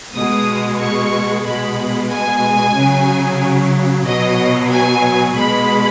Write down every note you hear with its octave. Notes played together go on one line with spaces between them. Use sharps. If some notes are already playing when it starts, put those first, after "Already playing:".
B2 G#3 D#6
C#6
B2 G#3 B5
G#5
C#3 F#3
B2 F#3 D#5
G#5
B2 G#3 B5